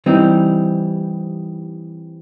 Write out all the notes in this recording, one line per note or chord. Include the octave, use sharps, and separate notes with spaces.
E3 G3 C4 D#4